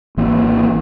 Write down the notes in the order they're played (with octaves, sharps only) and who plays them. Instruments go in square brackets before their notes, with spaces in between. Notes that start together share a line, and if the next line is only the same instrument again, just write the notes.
[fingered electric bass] G#1 E3 A#3